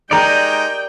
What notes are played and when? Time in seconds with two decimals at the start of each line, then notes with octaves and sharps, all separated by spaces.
0.11 G#3 D#4 G4 A#4 D5 G5 A#5 C#7